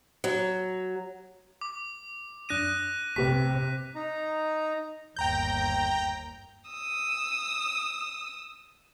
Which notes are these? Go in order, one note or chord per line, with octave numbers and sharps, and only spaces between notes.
F#3
D6
F#2 D4 D#6 F#6 A#6 D#7
C3 A3 G4 B4 B6
D#4 A#5
G1 D#2 G5 A#5 G6
D#6 E6